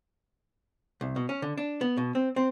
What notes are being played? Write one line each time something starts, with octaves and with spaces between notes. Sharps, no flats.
C2
B2
C#4
D3
D4
B3
B2
C4
C4